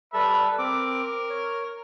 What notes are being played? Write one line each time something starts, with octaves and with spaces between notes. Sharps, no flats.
G3 A4 B4 E5 B5 E6
C4 A#4 D6
C#5